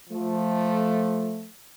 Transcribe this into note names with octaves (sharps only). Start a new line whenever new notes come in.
F3 A3